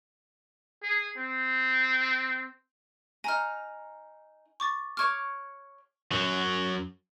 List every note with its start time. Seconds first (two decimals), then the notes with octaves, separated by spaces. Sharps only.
0.83 G#4
1.18 C4
3.24 D#4 G#5 A#5 F6
4.60 C#6 D6 A6
4.97 C#5 C#6 D6 F6 G#6
6.12 F#2 F#3